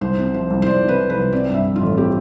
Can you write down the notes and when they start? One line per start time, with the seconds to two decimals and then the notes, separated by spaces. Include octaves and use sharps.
0.01 C2 C5
0.17 C3
0.33 F3 C5
0.50 C2
0.62 C5
0.66 C2 D5
0.83 C3
0.88 B4
1.00 F3
1.10 B4
1.16 C2
1.33 C4 D5
1.48 G2
1.54 E5
1.65 F3
1.76 F4
1.81 A1
1.97 C4 G4